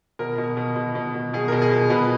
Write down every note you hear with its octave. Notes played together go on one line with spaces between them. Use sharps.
B2 A#4
B2
B2
B2
B2
B2
B2 G#4
B2 A#4
G#4
B2
B2 B4